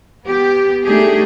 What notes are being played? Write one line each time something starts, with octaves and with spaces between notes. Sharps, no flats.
B3 G4
G3 A3 D4 D#4 G4 G#4